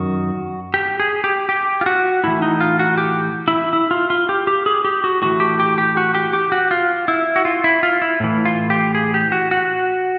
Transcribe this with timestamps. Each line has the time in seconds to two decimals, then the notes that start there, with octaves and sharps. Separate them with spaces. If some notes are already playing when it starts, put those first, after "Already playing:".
Already playing: F#2 D#3 F#4
0.74 G4
1.00 G#4
1.24 G4
1.49 G4
1.81 F4
1.86 F#4
2.24 A2 E3 E4
2.42 D#4
2.60 F4
2.79 F#4
2.98 G4
3.48 E4
3.73 E4
3.91 F4
4.10 F4
4.29 G4
4.47 G4
4.66 G#4
4.85 G4
5.04 F#4
5.22 A2 E3 F#4
5.40 G4
5.60 G4
5.78 G4
5.97 F#4
6.15 G4
6.33 G4
6.52 F#4
6.71 F4
7.08 E4
7.36 F#4
7.45 F4
7.64 E4
7.83 F4
8.02 E4
8.20 A2 E3
8.45 F4
8.70 G4
8.95 G#4
9.14 G4
9.32 F#4
9.51 F#4